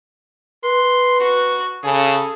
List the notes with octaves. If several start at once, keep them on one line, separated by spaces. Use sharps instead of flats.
B4 C6
F#4 C#6
C#3 G#4 A4